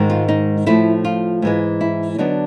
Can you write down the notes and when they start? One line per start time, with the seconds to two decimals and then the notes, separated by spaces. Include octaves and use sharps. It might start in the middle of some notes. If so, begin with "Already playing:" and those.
Already playing: G#2 D#3 G#3
0.10 F4
0.28 D#4
0.66 A2 F3 A3 E4
1.05 F4
1.42 G#2 E3 G#3
1.81 E4
2.18 D3 F#3 B3 D4 D#4